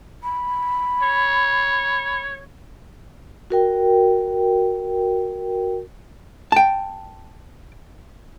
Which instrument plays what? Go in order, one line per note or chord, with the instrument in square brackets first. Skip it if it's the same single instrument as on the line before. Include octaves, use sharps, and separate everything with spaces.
[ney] B5
[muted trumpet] C#5
[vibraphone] F#4 A#4 G5
[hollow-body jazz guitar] G5 A5